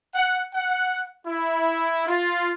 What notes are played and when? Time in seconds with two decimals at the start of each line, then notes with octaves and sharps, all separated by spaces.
0.14 F#5
0.54 F#5
1.25 E4
2.07 F4